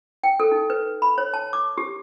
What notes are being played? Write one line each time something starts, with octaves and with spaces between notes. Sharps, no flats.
G5
A4
D#4
B4
B5
C#5
A5
D6
G4